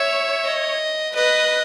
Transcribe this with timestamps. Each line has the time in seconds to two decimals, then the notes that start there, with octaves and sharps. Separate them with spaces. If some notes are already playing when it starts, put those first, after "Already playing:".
Already playing: C#5 E5
0.45 D#5
1.15 B4 D#5